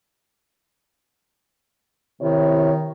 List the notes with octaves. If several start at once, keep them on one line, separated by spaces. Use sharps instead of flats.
C3 D#3 E4 C#5